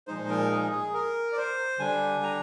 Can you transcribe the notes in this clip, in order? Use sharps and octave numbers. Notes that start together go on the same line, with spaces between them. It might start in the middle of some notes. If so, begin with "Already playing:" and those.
A#2 F3 G#3 D#4 C5
A#4
G#4
G#4
A#4
D5
C5
D3 G3 D4 G#5
A#5